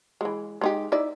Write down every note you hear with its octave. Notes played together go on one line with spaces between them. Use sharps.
E3 G#3
G#3 D#4 G4
D#4 E4 D5